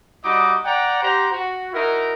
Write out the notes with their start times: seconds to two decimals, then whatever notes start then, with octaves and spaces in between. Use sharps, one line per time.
0.23 G3 D#4 F#4 D#5 D6
0.65 D5 F#5 G5 A#5
1.01 G4 C5 F#5 A#5
1.32 F#4
1.73 D#4 E4 F#4 A#4